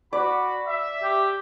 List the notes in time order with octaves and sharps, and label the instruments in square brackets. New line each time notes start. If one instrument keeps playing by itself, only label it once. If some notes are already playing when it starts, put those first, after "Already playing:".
[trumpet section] F#4 B5 [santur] D5
[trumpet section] E5
[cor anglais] G4